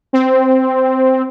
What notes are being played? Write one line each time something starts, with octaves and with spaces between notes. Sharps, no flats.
C4